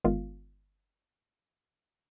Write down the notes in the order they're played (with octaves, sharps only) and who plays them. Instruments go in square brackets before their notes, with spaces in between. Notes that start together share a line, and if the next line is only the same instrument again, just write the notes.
[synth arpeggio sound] G1 D#3 G#3 B3 F4 F5